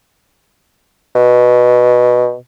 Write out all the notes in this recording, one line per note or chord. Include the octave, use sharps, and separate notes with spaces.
B2